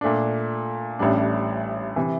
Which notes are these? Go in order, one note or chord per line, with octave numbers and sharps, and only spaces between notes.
A#2 A3 D4
A1 A2 G3 D4
C3 E3